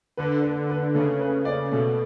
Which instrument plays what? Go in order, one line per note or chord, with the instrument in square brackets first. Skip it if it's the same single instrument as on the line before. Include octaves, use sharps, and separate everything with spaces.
[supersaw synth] D3 [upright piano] B4
[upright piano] B4
B4
[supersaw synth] C#3 [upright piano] A3
[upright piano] B4
D5
[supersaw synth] B2 [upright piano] A3